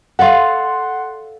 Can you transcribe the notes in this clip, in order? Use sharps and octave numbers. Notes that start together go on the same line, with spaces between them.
A4 D5 F5 F#5 C6